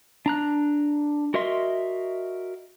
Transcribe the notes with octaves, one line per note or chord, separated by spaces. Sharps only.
D4 A#5 F#6
F#4 A#4 D#5 E5 C6